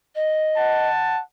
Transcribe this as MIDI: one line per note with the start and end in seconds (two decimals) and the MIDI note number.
0.15 0.88 75
0.56 1.20 78
0.56 1.20 81